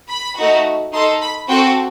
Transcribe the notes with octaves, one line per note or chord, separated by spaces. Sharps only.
B5
A3 D#4 F#4
D#4 A4 C6
B5
C4 F#4 A4 G5